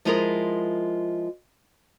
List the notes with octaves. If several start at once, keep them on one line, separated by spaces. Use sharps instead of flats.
F3 G#3 E4 F4 G#4 A#4